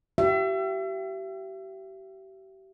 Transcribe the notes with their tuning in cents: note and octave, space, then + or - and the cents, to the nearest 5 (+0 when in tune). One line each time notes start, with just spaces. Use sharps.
G4 -35 E5 +35